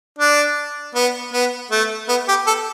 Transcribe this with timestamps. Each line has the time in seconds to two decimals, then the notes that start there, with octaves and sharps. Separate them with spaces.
0.19 D4
0.95 B3
1.33 B3
1.71 A3
2.09 B3
2.28 G4
2.47 A4